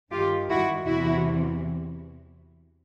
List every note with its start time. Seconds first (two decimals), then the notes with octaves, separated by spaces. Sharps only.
0.11 G2 D#3 F4 G4
0.50 E4 F#4
0.87 E2 C3 E3 E4 F#4